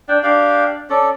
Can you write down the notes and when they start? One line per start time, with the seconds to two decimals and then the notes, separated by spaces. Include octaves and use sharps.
0.09 D4 G5
0.23 D4 G4 F5
0.90 C#4 A4 D5